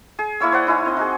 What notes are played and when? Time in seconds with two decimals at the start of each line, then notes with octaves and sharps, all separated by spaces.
0.19 G#4
0.40 A#3 E4 C#5 E6
0.52 C5 D5 F#5
0.67 D#4 E4 C#5 G#5
0.85 C4 D#5
0.97 D#4 F#4 G#4